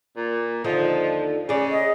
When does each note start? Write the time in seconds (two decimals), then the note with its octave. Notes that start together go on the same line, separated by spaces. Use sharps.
0.16 A#2
0.64 D#2 D3 F3 D#4
1.49 C#3 G#4 D5
1.71 D#5